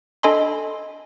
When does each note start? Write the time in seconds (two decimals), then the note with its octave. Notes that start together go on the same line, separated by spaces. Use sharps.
0.23 D4 A4 D#5 G#5 B5 C6